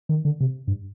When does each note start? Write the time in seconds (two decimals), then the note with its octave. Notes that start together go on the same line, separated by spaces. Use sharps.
0.09 D#3
0.25 D3
0.40 C3
0.68 G2